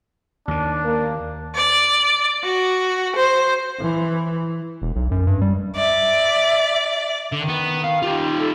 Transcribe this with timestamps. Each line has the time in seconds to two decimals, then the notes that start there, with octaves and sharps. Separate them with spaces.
0.48 D#2 D#3 D4
0.84 A#3
1.54 D5
2.44 F#4
3.17 C5
3.80 E3
4.82 E1
4.96 B1
5.11 F#2
5.27 G2
5.41 G3
5.76 D5 E5
7.32 D3 D#3
7.48 B3
7.84 F5
8.02 D#4 F4 G4
8.39 A4